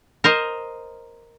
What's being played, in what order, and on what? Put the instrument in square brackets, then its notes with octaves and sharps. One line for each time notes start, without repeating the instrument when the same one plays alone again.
[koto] A#4 C5 D#5